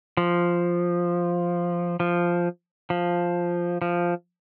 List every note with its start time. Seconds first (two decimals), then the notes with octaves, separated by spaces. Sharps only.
0.17 F3
2.00 F3
2.90 F3
3.82 F3